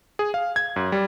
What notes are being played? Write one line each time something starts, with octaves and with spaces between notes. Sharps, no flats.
G#4
F5
G#6
F#2
G3